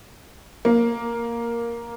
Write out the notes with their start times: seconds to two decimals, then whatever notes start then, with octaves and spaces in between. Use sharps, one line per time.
0.65 A#3